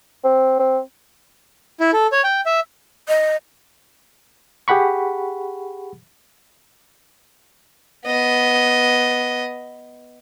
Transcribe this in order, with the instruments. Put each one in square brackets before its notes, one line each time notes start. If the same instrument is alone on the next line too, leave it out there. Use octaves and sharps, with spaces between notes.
[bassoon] C4
C4
[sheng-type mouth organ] E4
A4
C#5
G5
E5
[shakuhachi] D#5
[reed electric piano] G4 G#4 F#5 B5 C#6
[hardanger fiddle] B3 D#5